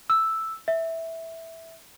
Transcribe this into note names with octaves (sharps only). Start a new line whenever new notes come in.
E6
E5